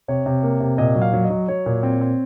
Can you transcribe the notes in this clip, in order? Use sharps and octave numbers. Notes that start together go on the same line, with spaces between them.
C3 C#5
C3
A#3
C3
A#2 D#5
F#3
F5
F#3
D#5
F#3
F#3 C#5
A#2
C4
C4